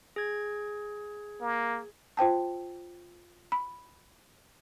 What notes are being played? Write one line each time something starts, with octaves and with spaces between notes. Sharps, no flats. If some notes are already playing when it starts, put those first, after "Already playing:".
G#4 G#6
A#3
F4 C5 G5 A5
B5